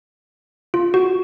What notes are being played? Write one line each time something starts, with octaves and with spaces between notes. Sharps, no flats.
F4
F#4